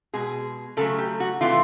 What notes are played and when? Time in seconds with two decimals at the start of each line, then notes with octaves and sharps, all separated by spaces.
0.14 B2 G#3 G#4
0.77 C#3 F#3 A3 A4
0.99 G4
1.20 F#4
1.41 C3 E3 A3 F4